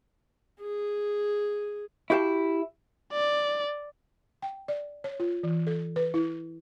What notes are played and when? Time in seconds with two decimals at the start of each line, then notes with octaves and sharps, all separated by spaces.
0.61 G#4
2.10 E4 F#4 G4 F5 A5
3.13 D5
4.42 G5
4.68 D5
5.04 C#5
5.20 F4
5.43 E3
5.67 A4
5.96 B4
6.14 E4